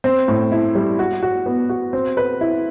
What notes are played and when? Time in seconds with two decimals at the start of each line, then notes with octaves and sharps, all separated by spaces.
0.04 C4
0.28 A2
0.52 E4
0.75 G3
0.99 F#4
1.23 F#4
1.46 B3
1.69 F#4
1.93 C4
2.17 B4
2.41 E4